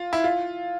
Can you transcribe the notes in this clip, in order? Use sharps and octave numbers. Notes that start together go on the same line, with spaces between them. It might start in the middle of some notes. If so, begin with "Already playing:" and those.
Already playing: F4
E4
F4